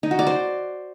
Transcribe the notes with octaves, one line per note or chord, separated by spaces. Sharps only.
D#4
F#4
D5
C5